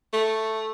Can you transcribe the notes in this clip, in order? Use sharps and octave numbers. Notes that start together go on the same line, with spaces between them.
A3